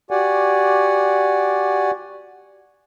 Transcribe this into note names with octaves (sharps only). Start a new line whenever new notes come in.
F#4 G4 D5 F#5 G#5